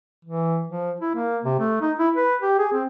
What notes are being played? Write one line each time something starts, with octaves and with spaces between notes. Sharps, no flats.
E3
F3
E4
A#3
C3
A3
D#4
E4
B4
G4
G#4
C4